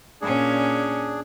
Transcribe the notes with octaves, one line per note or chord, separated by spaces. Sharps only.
A#2 C#4 D4 G#4